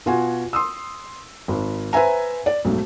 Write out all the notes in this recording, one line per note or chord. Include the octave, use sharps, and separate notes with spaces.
B2 F4 F#4 G#5
C6 D#6 E6
G#1
B4 C5 E5 G#5 A#5
D5
B1 G#2 A3